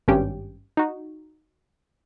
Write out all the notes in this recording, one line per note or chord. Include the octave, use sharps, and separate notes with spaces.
G#1 G2 C#4 G4 G5
D#4 F#4